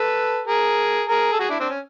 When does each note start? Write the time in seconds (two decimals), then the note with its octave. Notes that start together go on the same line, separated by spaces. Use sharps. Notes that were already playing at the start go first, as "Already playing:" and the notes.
Already playing: A4 B4
0.47 G#4 A#4
1.08 G#4 A#4
1.32 A4
1.39 F#4 G#4
1.50 D4 E4
1.60 C4 D4
1.70 C#4